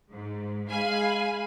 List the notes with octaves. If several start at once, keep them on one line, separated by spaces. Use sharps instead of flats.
G#2
G#3 F5 G#5 B5